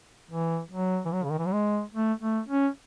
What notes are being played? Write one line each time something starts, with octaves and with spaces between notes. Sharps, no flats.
E3
F#3
E3
F#3
C#3
D#3
E3
F#3
G#3
A3
A3
C#4